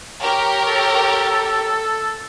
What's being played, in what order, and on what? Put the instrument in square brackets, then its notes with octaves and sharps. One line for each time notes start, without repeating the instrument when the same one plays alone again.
[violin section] G4 A#4 C#5
[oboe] A4